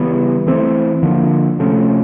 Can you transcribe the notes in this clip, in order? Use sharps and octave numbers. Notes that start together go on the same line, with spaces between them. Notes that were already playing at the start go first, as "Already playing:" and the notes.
Already playing: C#3 E3 G3 B3
E3 A3 C4
D3 F3 A#3
C3 F3 A3 C#4